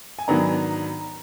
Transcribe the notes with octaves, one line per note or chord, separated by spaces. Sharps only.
G#5
G#2 D#3 F#3 B3 D4 A#5